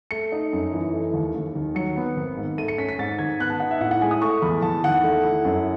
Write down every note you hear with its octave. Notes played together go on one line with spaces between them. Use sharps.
A3 C#7
D#4
F#2
E3
A3
D#2
D#2
D#3
F#3 C#7
B3
G#1
G#2
A3 D#7
C#7
C#4 B6
B6
G#2 A6
D#3 G#6
B3 F#6
A5
D#4 F#5
E5
A2 F#5
F#5
G#3 G#5
D#6
A3 C#6
E2 B5
E2 A5
D#3 F#5
A3
E4
F#2